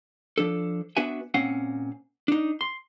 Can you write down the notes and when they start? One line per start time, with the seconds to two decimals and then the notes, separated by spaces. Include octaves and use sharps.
0.38 F3 D4 A4
0.97 B3 D4 F#4 B4 E5 G#5
1.34 A#2 C4 C#4 F5 F#5
2.28 D4 D#4
2.61 C6